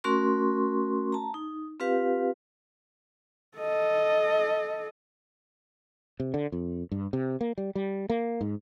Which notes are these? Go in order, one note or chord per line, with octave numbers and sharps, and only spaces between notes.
A3 C#4 F#4 A#4 C6 C#6
A5 A#5
D#4
C4 F4 G4 B4 F5
A4 D#5
C3
D3
F2
G2
C3
A#3
G3
G3
A#3
G#2